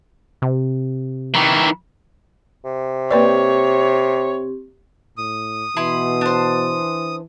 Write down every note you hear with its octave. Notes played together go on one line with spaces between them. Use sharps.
C3
D#3 E3
C3
A#3 C4 G4 B4 C#5 D5
A2 D#6
B2 E3 E4 B5 C6
D4 C5